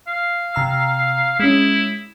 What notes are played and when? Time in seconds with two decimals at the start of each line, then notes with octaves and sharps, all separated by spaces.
0.07 F5
0.55 C3 A#5 E6
1.39 G#3 C#4 E4